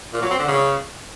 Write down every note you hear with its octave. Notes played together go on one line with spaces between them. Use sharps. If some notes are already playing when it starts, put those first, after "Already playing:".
A#2
F#3
C4
D3
C#3